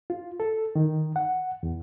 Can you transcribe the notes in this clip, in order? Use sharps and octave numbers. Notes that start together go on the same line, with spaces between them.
F4
A4
D#3
F#5
E2